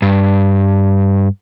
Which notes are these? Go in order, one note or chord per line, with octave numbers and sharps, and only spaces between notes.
G2